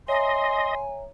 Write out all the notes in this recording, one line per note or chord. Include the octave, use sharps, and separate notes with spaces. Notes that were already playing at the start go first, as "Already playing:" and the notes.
C#5 D#5 E5 G#5 A#5 C6